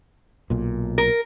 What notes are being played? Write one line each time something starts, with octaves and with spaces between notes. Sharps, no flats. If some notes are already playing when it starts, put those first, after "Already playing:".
B1 A#2
A#4